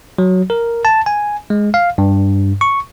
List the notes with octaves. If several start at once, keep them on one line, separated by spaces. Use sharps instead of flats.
F#3
A#4
A5
G#5
G#3
F5
G2
C#6